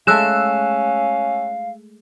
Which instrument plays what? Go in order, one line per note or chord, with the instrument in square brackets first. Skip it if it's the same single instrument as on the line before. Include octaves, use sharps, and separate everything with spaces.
[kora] G#3 A3 [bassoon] C#4 [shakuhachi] F5 [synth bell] E6 F#6 E7